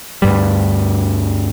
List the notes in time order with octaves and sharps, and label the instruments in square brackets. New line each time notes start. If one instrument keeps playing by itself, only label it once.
[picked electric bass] D2 G2 G3